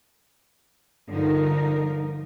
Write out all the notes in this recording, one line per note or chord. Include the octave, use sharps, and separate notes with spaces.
G2 D3 F3 D#4 A#4